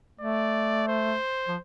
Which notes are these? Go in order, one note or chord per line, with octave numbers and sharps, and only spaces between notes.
A3 D5
C5
F3